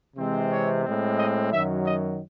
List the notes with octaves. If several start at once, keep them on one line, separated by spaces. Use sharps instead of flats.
C3 E3 G#3 C4
C#5
A2 G#3 C4
D#5
F#2 D#3 F#3 E5
D#5